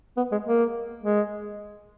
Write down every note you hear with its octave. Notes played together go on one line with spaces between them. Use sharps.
B3
G#3
A#3
G#3